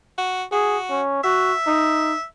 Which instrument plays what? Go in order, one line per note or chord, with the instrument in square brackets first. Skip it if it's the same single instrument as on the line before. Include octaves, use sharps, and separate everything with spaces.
[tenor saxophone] F#4
[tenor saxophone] F#4 [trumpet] G#4
[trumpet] C#4
[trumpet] F#4 [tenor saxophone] E5
[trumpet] D#4